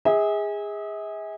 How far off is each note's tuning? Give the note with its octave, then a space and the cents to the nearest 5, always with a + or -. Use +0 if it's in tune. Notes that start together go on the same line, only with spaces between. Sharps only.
G#4 -20 E5 -45